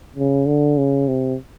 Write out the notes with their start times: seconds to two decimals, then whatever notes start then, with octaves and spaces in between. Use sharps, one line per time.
0.16 C#3
0.46 D3
0.77 C#3
1.08 C3